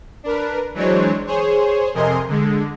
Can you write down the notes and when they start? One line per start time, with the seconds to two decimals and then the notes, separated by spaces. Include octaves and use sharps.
0.24 D4 A#4 B4
0.74 E3 F#3 G#3 D4 C5 C#5
1.26 G#4 C5 C#5
1.94 F2 C3 A#4 D#5 G#5 C6
2.28 D3 G#3